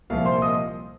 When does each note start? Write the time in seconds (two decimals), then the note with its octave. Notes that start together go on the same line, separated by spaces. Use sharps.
0.10 C2 A#2 F3 F5
0.26 C5 C6
0.42 D#5 D#6